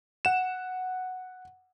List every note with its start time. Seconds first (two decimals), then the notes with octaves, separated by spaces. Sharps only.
0.25 F#5 E7